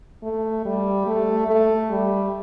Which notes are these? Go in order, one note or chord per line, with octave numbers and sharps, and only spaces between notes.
A3
G3
A3
A3
G3